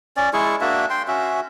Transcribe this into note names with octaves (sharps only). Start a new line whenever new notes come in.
C#4 D5
G#3 E4 G#4 C#6
A#3 D4 F#4 E5
G5 C6
C#4 F#4 E5